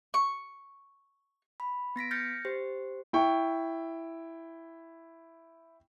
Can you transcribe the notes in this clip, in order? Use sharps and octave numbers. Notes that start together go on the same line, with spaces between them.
C#6
B5
B3 A#6 B6 D7
F6 G6 A6 A#6 C#7
G4 C5
E4 G5 C#6